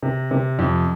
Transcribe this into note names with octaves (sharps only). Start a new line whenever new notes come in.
C3
C3
F2